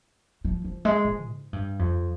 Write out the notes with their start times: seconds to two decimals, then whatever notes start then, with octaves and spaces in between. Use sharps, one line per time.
0.45 F3
0.65 F3
0.85 G#3
1.05 F3
1.26 G#2
1.53 G2
1.79 F2